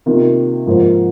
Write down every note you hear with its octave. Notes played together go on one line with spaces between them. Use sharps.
C3 D#3 A#3 F4
G#2 F3 A#3 F4 C5